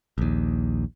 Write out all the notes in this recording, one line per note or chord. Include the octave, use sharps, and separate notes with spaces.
A#1 D#2